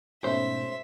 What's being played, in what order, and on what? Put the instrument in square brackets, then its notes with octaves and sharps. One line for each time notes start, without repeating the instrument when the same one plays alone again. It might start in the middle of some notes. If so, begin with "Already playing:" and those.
[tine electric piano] G#2 B2 [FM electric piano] A3 C#4 [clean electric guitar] C5 [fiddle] E5